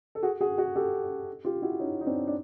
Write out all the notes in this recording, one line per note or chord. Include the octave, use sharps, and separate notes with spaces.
A4
F#4 G#4
F#4 G#4
F#4 G#4
G4 A4
F4 G4
E4 F#4
C#4 D#4
D#4
C4 D4
D4